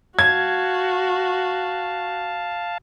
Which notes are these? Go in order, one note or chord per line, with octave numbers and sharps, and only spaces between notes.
F#4 F5 A5 G#6